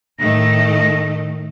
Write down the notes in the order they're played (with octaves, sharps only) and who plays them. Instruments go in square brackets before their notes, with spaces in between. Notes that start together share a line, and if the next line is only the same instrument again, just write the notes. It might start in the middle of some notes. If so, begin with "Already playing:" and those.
[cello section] A2 D#3 A3 [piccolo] A#6